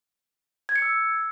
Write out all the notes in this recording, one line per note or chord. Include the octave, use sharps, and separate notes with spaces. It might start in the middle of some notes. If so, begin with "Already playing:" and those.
G#6
C#7
E6